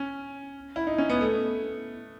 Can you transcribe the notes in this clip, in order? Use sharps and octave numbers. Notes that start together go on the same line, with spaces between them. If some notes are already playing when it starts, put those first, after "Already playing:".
Already playing: C#4
E4
D#4
C#4
B3
A3